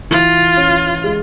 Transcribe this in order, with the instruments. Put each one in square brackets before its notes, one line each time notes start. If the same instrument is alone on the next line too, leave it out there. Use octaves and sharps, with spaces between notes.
[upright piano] E3 [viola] F4
[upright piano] C#4
G#3